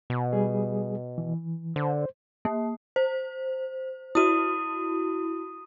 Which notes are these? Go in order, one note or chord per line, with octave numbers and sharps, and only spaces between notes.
B2
G3 G#4
E3
D3 C5
A#3
C5
E4 F#4 D#6 D#7